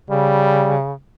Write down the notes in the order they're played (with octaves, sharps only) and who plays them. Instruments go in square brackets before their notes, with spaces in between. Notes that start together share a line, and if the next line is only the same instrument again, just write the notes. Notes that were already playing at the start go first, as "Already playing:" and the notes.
[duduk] C#3 [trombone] G3